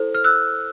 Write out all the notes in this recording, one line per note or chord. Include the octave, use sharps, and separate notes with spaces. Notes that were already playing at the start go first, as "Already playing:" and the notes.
Already playing: E4 A4 C5
F6
E6 F#6